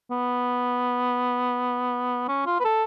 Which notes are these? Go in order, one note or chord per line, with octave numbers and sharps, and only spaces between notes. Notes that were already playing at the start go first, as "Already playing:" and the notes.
B3
C#4
F4
B4
A4